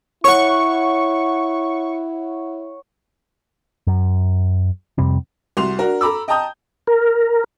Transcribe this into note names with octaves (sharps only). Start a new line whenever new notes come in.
E4 C#5 F#5 C#6
F#2
F2 C3 G3 C4
C2 F#4 C6 F7
D4 F#4 A#4
A4 A#5 B5 D6 E6
D#5 G5 A5 A#5 D#6 G6
A#4